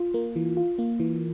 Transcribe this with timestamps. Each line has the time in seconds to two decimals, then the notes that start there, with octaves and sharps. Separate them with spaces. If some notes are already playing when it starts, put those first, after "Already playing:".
Already playing: F4
0.14 A#3
0.36 E3
0.57 F4
0.78 A#3
1.00 E3